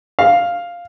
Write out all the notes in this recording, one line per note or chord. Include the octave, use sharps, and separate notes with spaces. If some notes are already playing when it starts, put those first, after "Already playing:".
F5